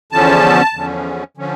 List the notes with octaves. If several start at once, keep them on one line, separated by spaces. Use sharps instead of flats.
E2 D3 F3 C#4 A5
E2 D3 F3 C#4
D3 F3 C#4